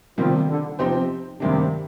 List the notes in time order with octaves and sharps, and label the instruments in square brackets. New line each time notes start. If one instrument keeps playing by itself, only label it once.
[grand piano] C3 D#3 G3 A#3 [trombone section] F3
[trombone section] D3
[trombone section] C3 [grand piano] F3 C4 D#4 G4 C5
[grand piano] G2 D#3 A#3 D4 [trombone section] C3